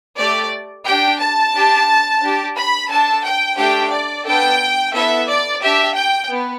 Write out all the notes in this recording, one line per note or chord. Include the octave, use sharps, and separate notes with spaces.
A3 G4 D5
D4 G4 G5
A5
D4 G4
D4 G4
B5
D4 A4 A5
G5
A3 D4 G4 G5
D5
B3 D4 A4 G5
B3 E4 A4 E5
D5
D4 G4 E5
G5
B3